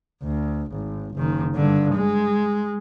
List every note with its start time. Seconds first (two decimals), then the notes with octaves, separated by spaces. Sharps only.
0.23 D2
0.71 G#1
1.15 F#1 D#3
1.55 G2 D3
1.94 G#3